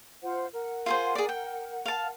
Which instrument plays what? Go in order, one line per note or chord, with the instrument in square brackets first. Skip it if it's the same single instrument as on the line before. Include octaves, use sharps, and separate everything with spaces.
[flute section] F4 C5 F#5
A#4 F#5
[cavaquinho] F4 G#4 C5
G#4 D5
G5
F5 A5